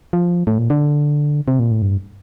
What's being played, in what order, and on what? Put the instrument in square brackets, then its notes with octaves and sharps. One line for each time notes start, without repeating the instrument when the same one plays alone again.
[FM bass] F3
A2
A#2
D3
C3
A#2
A2
G2